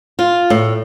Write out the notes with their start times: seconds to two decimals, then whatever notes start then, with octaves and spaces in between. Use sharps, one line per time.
0.19 F4
0.50 A2